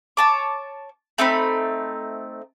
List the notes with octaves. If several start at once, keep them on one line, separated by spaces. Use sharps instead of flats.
C#5 A5 D6
A3 C4 D#4 B5